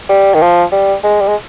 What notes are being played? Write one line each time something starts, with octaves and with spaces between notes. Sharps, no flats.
G3
D#3
F3
G3
G#3
G3
G#3